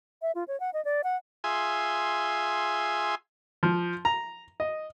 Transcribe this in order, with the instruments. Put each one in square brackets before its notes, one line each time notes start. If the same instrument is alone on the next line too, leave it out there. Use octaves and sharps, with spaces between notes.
[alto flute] E5
F4
C#5
F#5
D#5
D5
F#5
[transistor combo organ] F4 G#4 E5 G#5 C6
[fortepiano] F3
A#5
D#5